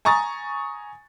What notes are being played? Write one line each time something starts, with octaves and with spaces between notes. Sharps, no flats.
G#5 A#5 C#6 D#6 A6